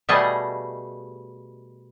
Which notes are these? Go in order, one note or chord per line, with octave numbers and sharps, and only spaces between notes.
B2 G3 A3 G#4 D#5 A5